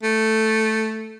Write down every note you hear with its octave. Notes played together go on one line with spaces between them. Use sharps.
A3